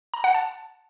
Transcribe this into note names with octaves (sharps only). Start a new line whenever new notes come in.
A#5
F#5
A5